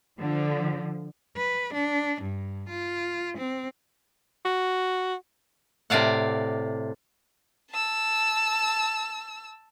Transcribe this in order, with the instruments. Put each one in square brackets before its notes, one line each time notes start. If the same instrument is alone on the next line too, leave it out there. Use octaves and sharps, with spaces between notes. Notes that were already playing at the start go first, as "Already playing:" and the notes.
[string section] D3 F3
[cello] B4
D4
G2
F4
C4
[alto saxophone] F#4
[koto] A2 C3 D5 F5 F#5
[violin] A5 E6